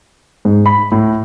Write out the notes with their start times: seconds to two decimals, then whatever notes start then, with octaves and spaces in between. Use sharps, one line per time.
0.45 G#2
0.66 B5
0.92 A2